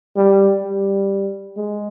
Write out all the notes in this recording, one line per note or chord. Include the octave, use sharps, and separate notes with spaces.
G3
G3
G#3